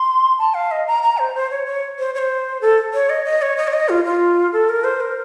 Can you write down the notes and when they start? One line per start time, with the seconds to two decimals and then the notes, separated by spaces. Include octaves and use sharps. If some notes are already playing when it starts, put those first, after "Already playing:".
Already playing: C6
0.38 A5
0.54 F5
0.71 D#5
0.87 A#5
1.03 A#5
1.18 C5
1.35 C5
1.51 C#5
1.66 C#5
1.99 C5
2.15 C#5
2.18 C5
2.61 A4
2.94 C#5
3.10 D#5
3.25 D#5
3.42 C#5
3.57 D#5
3.67 C#5
3.73 D#5
3.89 F4
4.05 F4
4.53 A4
4.69 A#4
4.84 C5
5.00 A#4